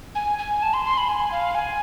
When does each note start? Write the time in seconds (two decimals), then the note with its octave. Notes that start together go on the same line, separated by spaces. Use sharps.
0.15 G#5
0.38 G#5
0.62 A5
0.74 C6
0.85 C6
0.98 B5
1.09 G#5
1.32 F5
1.55 G#5